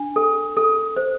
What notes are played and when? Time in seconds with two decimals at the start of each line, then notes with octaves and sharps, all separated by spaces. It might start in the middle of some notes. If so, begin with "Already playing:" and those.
Already playing: D4
0.16 A4
0.57 A4
0.97 C5